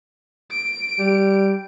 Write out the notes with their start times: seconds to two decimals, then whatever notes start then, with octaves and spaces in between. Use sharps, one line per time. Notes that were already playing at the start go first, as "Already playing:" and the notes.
0.51 D7
0.99 G3